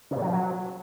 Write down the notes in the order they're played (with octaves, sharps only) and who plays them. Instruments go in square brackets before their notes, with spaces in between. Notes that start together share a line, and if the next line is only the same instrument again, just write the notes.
[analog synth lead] C#3
A#2
F#3
F3
F#3